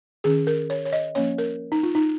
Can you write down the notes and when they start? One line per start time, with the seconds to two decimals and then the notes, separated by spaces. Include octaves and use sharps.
0.24 D#3 C#4 G#4
0.47 A#4
0.70 C#5
0.85 C#5
0.92 D#5
1.15 F3 A#3 C#4 C#5
1.38 A#4
1.72 D#4
1.83 F4
1.95 D#4